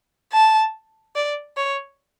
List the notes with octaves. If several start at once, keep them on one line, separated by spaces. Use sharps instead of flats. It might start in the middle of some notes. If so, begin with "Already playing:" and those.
A5
D5
C#5